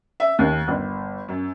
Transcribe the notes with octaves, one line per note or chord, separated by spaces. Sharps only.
E5
D#2
G1
F#2